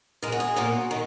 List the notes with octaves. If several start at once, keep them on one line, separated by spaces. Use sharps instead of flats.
D#3 G#3 A#4
F#4
G#4
A#2 A#3 F#4
D#3